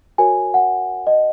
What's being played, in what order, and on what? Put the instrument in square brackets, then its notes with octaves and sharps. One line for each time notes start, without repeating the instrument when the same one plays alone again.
[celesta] F#4 A#4 C#5 G#5
F#5
D#5